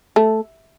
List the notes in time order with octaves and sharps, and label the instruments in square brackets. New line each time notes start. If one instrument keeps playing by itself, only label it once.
[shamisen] A3